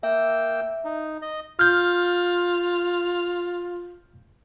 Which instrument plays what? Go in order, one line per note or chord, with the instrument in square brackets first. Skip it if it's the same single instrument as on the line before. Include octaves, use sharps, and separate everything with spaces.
[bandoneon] A#3 G5 E6 [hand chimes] E5
[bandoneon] D#4
D#5
[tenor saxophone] F4 [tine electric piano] F6 G6